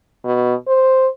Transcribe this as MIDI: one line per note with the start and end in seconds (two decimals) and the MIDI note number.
0.24 0.55 47
0.67 1.08 72